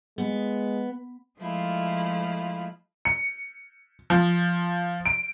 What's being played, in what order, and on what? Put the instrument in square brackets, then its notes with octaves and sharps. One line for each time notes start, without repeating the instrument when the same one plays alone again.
[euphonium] G#3 [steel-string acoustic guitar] B3
[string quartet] F3 G#3 A3 E4 F4
[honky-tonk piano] C#7
F3
D7